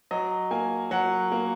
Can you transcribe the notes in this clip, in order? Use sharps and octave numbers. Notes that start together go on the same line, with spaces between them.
F#3 D#5
A#3 G#5
F#3 F#5
A#3